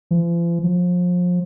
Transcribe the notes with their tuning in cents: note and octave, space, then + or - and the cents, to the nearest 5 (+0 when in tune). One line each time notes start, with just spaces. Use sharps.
F3 -45
F3 +30